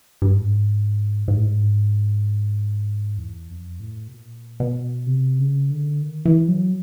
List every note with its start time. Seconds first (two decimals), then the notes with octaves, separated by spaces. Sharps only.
0.22 G2
0.33 G#2
1.28 G#2
1.36 A2
1.45 G#2
3.18 E2
3.49 F2
3.80 A2
4.07 B2
4.12 A#2
4.60 B2
5.07 C3
5.39 C#3
5.70 D3
6.02 D#3
6.25 E3
6.48 F#3